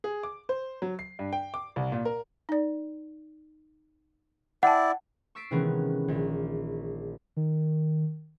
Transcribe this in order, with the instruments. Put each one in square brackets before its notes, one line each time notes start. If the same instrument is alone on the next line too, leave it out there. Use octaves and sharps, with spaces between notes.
[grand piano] G#4
D6
C5
F#3
C7
G2
G5
D6
C2
A#2
A#4
[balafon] D#4 D5
[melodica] E4 D5 [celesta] F#5 [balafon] G5 A5
[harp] C#6 E6 A6 B6 C7 D7
C3 D#3 E3 G#3 B3 C#4
A#1 D#3
[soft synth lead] D#3